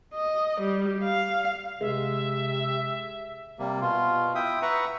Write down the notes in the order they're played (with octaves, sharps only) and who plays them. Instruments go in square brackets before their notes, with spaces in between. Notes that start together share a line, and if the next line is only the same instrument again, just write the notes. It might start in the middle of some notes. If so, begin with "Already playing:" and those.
[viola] D#5
G3
F5
[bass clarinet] C3 [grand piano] G#3 [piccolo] E5
[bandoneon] C3 G3 A#3
B2 F4
E4 E5 G5 D#6
B4 E5 F#5 A#5 C#6